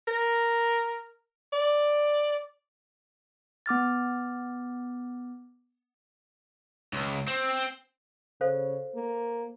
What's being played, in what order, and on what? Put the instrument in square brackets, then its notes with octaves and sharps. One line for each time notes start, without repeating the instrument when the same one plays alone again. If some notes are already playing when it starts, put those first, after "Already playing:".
[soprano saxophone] A#4
D5
[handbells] B3 D6 F6 A6
[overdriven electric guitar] C#2
C4
[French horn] C#3 [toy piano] A4 C5 F5
[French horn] A#3